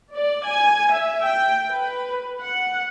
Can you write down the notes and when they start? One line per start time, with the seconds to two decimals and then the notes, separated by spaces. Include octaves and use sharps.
0.13 D5
0.45 G#5
0.92 E5
1.26 G5
1.70 B4
2.42 F#5